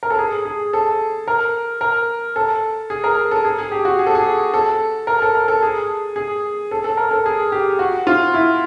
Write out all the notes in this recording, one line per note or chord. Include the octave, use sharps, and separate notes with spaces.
A#4
A4
G#4
G#4
A4
A#4
A#4
A4
G#4
A#4
A4
G#4
G#4
G4
F#4
G#4
A4
G#4
A4
A#4
A4
A#4
A4
G#4
G#4
A4
A4
A#4
A4
G#4
G4
F#4
F4
E4